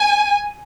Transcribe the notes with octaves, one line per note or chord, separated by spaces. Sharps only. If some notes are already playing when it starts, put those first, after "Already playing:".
Already playing: G#5